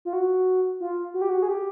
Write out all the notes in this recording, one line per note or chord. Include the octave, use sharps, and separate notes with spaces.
F4
F#4
F4
F#4
G4
F#4
G#4
G4